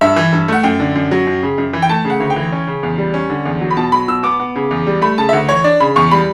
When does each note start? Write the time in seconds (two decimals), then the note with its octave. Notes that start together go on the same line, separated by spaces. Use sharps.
0.01 G2 E5
0.16 E3
0.33 G2
0.48 A3 F#5
0.63 F#2 G5
0.80 D3
0.95 F#2
1.11 F#3
1.27 F#2
1.43 C#3
1.58 F#2
1.73 E3
1.82 G5
1.89 A3 A5
2.05 C#3
2.10 F#5
2.20 D2
2.30 G5
2.36 E3
2.52 C#4
2.67 C#3
2.83 E2
2.98 G3
3.14 C#4
3.30 D3
3.45 E2
3.61 F#3
3.71 B5
3.77 B2 A5
3.92 F#3 B5
4.08 B2 E6
4.23 B3 D6
4.40 B3
4.56 C#3
4.71 E2
4.87 G3
5.02 A3 B5
5.18 C#3 A5
5.29 E5
5.33 D2 F#5
5.48 E3 C#5
5.64 D4 D5
5.80 C#3 B5
5.96 E2 C#6
6.11 G3 B5